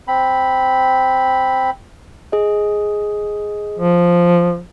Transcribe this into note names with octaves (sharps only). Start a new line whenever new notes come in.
C4 B5
G#4 D#5
F3